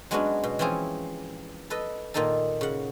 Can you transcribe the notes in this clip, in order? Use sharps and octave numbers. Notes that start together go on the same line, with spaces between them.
F#3 G#3 B3 C#4 D4 F#4
B2
E3 F3 C4 C#4 G#4
A4 B4 D#5
A#2 D#3 A#3 D#4 A4
C#3 F#5